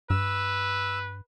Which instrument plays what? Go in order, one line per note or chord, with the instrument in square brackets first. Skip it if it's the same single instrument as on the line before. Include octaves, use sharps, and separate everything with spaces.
[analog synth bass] G2 [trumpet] B4 [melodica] E6